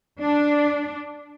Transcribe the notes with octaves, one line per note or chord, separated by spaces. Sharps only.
D4